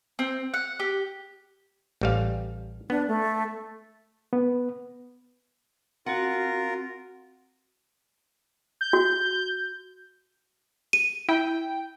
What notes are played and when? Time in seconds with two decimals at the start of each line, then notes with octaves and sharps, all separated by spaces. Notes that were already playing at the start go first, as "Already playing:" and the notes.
0.19 C4
0.54 F#5
0.80 G4
2.01 A1 G3 F5
2.90 B3 D4
3.08 A3
4.33 B3
6.06 C4 F4 F#4 A#4 F#5
8.81 G6
8.93 F#4
10.93 D#7
11.29 E4 G5